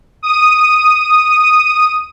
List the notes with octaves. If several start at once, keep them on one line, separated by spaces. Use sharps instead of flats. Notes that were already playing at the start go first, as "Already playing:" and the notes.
D#6 D#7